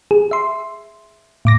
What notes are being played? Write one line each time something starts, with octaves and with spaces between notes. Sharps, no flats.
G#4
E5 C6
A2 D6 A#6